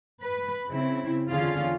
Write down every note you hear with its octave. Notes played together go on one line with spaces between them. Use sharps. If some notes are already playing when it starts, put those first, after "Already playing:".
B4
C#3 C4 E4
E2 D3 C#4 F4 G#4 F5